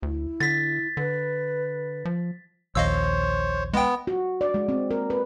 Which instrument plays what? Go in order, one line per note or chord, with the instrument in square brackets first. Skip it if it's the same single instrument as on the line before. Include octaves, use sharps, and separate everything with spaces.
[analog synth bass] D2 [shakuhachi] E4
[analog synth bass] D3 [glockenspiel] A6 B6
[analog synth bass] D3 [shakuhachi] B4
[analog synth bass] F3
[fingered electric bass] A#1 D#2 [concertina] C5 C#5 [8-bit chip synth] D#5 F5 E6
[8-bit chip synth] G#3 G5 [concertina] B3
[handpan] F#4
D5
G#3
C4
A#4
B4